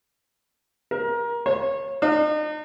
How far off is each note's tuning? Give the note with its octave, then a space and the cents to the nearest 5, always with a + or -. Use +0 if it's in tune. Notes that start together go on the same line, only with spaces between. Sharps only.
A#4 +25
C#5 -25
D#4 -40